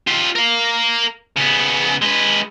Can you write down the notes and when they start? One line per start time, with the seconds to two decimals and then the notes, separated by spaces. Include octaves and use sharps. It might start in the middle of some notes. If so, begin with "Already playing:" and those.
0.07 F4 G4
0.36 A#4 F5
1.37 C#3 B3
2.02 G#3 B4